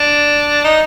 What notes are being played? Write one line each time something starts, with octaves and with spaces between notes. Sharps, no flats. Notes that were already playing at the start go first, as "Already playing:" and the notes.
Already playing: D4
D#4